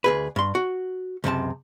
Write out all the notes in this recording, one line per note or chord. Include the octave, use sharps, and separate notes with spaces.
D2 G#4 B4
G2 C6
F#4
C#2 F#2 C3 A5